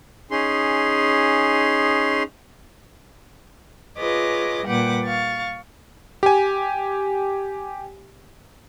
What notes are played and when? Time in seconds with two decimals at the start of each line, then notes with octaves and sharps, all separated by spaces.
0.31 C#4 D#4 G#4 C6
3.97 F4 G#4 B4 C#5 D#5 D6
4.67 A#2 G3 B4 F#5 G5 D6
5.04 F5 C#6 A6
6.23 G4 G#5